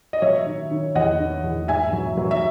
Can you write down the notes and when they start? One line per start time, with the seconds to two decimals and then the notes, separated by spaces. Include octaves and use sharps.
0.13 D#5
0.22 F#3 C#5 E5
0.46 D#3
0.71 D#3
0.95 E2 D#5 F#5
1.19 D#3
1.44 E2
1.68 G#2 E5 G#5
1.93 F#3
2.17 F#3
2.31 E5